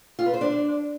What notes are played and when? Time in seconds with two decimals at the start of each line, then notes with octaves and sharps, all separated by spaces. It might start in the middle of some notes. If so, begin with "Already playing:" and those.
0.19 F4
0.26 B4
0.34 C5
0.41 D4